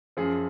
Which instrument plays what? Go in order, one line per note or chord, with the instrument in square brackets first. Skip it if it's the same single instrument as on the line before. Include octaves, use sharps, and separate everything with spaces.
[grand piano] F#2 F3 G#4